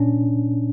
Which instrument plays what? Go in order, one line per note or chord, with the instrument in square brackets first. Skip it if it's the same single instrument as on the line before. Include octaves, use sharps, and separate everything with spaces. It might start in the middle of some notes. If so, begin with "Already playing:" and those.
Already playing: [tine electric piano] A#2 C#4 D4